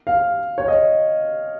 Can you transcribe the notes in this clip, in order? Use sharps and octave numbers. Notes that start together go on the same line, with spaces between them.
F5
C#5
D#5